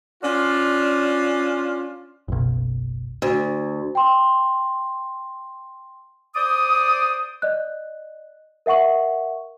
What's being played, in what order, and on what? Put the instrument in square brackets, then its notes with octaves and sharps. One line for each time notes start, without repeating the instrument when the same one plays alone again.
[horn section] C#4 D4 F4
[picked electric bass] F#1 B1
[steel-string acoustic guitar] D2
[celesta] G5 C6
[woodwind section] C5 D5 D6 D#6
[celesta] D5 D#5 F#6
A#4 E5 F#5 C#6 F#7